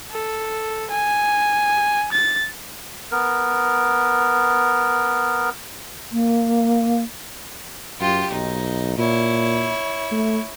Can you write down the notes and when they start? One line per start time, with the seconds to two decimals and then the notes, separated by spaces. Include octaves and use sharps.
0.11 A4
0.90 G#5
2.12 A6
3.11 B3 A#4
6.12 A#3
8.00 F#2 F4 G4
8.31 B1 D#4
8.98 A#2 E4 C#5
10.11 A3